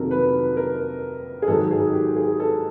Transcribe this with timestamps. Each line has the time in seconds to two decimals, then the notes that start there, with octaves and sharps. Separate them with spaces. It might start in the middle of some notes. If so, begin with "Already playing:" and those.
Already playing: F2 C3 D#3 F#3 A#3 A4 A#4
0.11 B4
0.57 A#4
1.42 G#4
1.48 G#2 D#3 F#3 A4
1.71 G#4
1.93 G4
2.16 G#4
2.40 A4